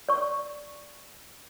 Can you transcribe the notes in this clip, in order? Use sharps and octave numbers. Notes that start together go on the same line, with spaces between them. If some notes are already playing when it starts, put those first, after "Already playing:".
D5 C#6